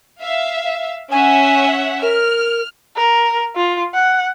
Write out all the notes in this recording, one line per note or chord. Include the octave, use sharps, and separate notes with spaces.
E5 F5
C#4 E5 F#5 G#5
A#4 F6
A#4
F4
F#5